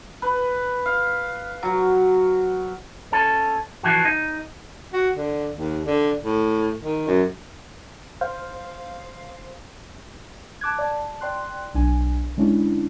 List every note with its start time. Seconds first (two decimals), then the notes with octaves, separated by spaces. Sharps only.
0.22 B4
0.86 F5
1.63 F#3
3.12 C#4 A4
3.83 E3 F3 F#4
4.05 D#4
4.93 F#4
5.16 D3
5.56 D#2
5.87 D3
6.25 A2
6.84 D#3
7.07 F#2
8.21 C5 F5
10.61 A5 D6 F#6 G#6
10.78 D5 A5
11.21 D5 G5 C6 F#6
11.74 B1 D4 G#5
12.37 D3 G#3 C#4 D4 E4